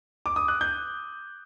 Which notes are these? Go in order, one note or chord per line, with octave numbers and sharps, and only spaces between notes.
D6
D#6
F#6
G6